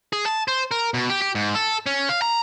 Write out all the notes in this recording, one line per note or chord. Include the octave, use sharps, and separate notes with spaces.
G#4
A5
C5
A#4
B2
G4
G4
G#2
A4
C#4
F5
A#5